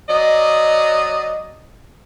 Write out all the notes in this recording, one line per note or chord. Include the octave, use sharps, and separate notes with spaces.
F#3 D5 D#5